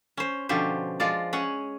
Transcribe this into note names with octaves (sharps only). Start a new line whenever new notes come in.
C#4 C5
B2 D3 F3 C#4 G4 C5
F3 G#3 F4 D5
C#4 G#4 F#5